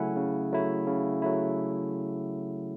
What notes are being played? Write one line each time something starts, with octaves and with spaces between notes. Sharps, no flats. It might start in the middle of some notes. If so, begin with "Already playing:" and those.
Already playing: C#3 F#3 A3 E4 F#5 G#5
C#3
F#3 A3 E4
C#3
F#3 A3 E4